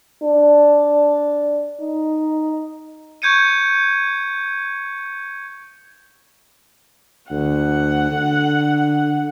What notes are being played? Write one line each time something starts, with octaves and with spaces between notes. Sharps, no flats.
D4
D#4
C#6 G6 G#6 C#7 D#7
D2 F#5
D3